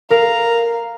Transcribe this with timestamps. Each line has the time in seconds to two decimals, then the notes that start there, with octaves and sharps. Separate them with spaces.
0.10 A#4 F5 A#5